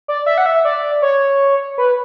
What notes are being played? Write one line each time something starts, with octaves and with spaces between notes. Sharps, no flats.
D5
E5
F#5
E5
D5
C#5
B4